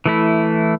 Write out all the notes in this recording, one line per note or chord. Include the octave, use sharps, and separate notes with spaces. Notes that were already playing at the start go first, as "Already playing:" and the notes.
E3 A3 E4